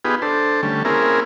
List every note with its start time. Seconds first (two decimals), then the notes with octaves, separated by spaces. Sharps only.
0.05 B3 D#4 F4 G4 G#4 B4
0.22 D4 A4 C5
0.63 D3 G3 A3 C#4
0.85 A#3 C4 C#4 E4 G#4 A#4